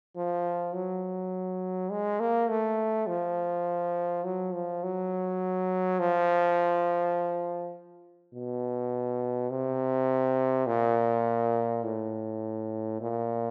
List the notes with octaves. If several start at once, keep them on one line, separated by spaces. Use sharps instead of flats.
F3
F#3
G#3
A#3
A3
F3
F#3
F3
F#3
F3
B2
C3
A#2
A2
A#2